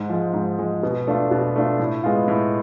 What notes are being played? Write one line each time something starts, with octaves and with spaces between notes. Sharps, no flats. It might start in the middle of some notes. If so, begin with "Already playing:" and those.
Already playing: G#2
F3 G#3
G#2
F3 G#3
B2
A3 D4 F4
B2
A3 D4 F4
A2
G#3 B3 F4
A2